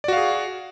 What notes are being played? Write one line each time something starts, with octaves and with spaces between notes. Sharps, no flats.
F#4 G#4 D5 F5